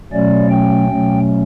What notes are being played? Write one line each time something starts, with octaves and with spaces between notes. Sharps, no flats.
B2 F#3 A3 C#4 D5
G5
B2 F#3 A3 C#4